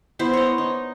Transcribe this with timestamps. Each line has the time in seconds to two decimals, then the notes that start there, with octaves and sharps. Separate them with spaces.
0.19 B3 E4 C5
0.33 C#5 D#5
0.58 D#4